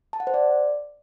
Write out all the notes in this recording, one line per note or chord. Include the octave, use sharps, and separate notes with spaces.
A5
F#5
C5
D5